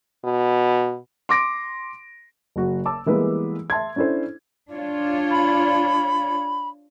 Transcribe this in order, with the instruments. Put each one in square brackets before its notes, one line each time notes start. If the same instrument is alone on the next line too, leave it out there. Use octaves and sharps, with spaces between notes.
[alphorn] B2
[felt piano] C6 D6 A#6 D7
[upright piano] F#1 F#4
A5 D6 E6
E3 G3 G#3 A#3 B3 B4
E5 A5 C6 G#6
C#4 D4 E4 A4 C5
[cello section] D4 F4 C#5
[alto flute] B5